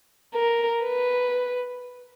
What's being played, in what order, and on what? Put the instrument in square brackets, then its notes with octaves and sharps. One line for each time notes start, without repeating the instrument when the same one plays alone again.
[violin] A#4
B4